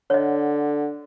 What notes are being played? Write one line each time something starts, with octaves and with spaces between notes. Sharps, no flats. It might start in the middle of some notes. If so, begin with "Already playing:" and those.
D3 D4 A4 C#5 D#5 F#5